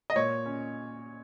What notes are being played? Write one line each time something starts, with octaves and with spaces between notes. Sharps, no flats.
D#5
A#2 C#5
C#4